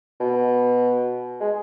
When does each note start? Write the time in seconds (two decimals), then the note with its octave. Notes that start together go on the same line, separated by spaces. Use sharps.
0.20 B2
1.40 G#3